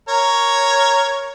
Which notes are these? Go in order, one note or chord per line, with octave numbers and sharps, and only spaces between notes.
A#4 C#5